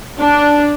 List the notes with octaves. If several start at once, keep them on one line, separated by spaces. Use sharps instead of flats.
D4